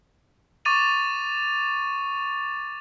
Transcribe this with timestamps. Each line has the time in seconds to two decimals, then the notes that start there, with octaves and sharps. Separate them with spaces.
0.65 C#6 D6 A6 D#7 F7